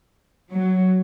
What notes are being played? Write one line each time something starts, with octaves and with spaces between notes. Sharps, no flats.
F#3